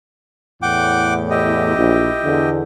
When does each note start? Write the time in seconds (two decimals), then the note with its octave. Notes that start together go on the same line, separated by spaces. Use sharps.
0.62 E2 A2 F#5 G5 D6
1.30 E4 G4 D#5
1.76 A#1
2.24 E2 D3